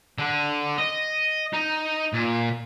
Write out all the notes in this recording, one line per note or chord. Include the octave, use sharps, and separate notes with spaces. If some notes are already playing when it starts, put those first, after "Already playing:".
D3
D#5
D#4
A#2